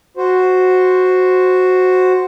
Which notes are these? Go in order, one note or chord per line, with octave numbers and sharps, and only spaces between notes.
F#4 C5